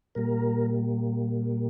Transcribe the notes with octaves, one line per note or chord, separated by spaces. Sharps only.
A#2 G3 A#3 A#4